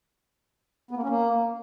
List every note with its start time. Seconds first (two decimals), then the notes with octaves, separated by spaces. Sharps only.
0.91 B3
0.97 A#3
1.03 C#4
1.09 A#3